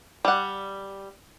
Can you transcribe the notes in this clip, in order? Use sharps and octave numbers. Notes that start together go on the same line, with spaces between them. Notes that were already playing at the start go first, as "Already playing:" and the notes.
G3 F#5